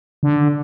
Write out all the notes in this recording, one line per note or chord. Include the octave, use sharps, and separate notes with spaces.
D3